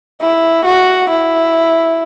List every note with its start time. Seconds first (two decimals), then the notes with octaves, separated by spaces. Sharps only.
0.21 E4
0.65 F#4
1.10 E4